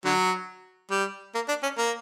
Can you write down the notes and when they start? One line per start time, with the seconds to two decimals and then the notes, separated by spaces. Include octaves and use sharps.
0.05 D3 F#3
0.91 G3
1.35 A#3
1.48 D4
1.63 C#4
1.78 A#3